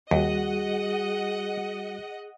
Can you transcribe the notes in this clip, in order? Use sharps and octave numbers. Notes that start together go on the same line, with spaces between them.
D#2 G3 F#4 G#4 D#5 F#5